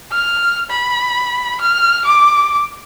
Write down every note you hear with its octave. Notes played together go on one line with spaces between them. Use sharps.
F6
B5
F6
D6